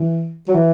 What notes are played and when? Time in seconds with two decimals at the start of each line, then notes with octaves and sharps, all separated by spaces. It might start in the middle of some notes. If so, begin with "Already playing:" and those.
Already playing: E3
0.48 F#3
0.54 E3